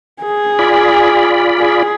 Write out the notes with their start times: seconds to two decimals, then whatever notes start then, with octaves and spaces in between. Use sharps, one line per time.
0.23 G#4
0.59 F4 D5 B5
1.59 G#4